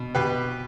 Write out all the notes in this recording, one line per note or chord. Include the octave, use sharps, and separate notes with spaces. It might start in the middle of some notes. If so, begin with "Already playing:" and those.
Already playing: B2
B2 G4 B4